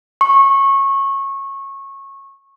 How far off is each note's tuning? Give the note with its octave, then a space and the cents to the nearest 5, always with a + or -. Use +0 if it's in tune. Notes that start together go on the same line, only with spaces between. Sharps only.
C#6 -20